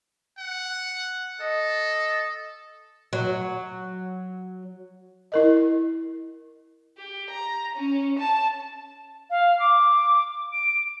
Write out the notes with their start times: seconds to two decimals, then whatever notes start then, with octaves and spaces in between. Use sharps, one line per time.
0.38 F#5
1.40 A4 D#5
3.13 F#3
5.32 E4 A#4 D#5
6.98 G4
7.30 A#5
7.76 C#4
8.19 A5
9.30 F5
9.59 D6
10.52 D7